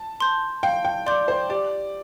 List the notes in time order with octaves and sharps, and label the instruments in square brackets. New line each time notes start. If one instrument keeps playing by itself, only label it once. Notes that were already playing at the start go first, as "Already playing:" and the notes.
Already playing: [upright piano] A5
[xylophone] C6 G6
[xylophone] F5 [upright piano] G5
[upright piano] G5
[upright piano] D5 [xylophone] C6 G6
[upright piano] C5
[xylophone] G4 [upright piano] D5